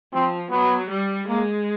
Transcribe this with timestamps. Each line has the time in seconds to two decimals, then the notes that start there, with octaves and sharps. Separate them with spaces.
0.13 F3 C4
0.50 F#3 B3
0.90 G3
1.27 G#3 A#3